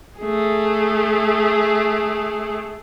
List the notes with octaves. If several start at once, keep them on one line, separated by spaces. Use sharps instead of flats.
A3 G#4